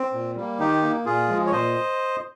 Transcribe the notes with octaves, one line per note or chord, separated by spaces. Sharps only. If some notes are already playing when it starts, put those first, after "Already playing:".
Already playing: C4
A#2
G3 A#3
D#3 D#4 G4
A#3
A#2 F4 G#4
F3 G#3
C#5
A#2 C5 D#5